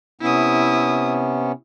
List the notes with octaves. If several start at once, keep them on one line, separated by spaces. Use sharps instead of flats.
C3 B3 C#4 E4 D#6